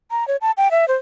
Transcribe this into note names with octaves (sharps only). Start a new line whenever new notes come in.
A#5
C#5
A5
G5
E5
C5